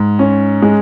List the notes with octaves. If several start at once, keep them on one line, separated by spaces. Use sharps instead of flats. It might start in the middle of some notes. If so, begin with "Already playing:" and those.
Already playing: G#2
C#4
G#3